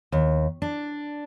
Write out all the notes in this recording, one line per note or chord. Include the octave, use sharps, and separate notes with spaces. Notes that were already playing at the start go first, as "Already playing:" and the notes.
D#2
D4